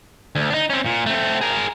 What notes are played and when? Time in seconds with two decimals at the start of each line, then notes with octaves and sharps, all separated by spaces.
0.35 D2
0.50 D4 D#4
0.70 C4 C#4
0.86 A#2
1.06 A3 C4
1.41 G#4 A#4